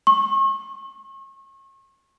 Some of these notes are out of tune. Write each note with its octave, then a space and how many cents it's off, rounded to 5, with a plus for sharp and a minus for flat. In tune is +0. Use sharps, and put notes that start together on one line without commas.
C#6 -40